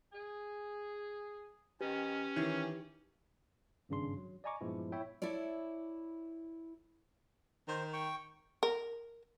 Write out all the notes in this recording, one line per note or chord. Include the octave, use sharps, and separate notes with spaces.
G#4
D#3 C#4 G4 B4
D#3 E3 C#5
G#1 G2 C#3 D4 C6
F#3
D5 D#5 G#5 A#5 C#6 D6
G2 A#2 F3 G#3 B3 E4
E4 C#5 E5 G5
E4 A4 C#5 D5
D#3 C5
G5 C#6
A#4